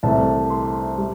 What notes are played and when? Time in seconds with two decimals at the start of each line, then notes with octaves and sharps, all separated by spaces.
0.03 C2 C3 E3 A3 A5
0.50 C6
0.98 G3